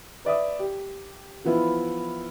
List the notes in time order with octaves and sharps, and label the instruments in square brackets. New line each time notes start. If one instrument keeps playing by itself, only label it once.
[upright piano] B4 D5 E5 D#6
G4
E3 F3 B3 E4 F4